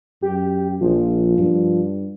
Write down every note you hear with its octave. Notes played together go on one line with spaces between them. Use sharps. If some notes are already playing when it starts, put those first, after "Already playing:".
F#2 G4
A#1 F3
G2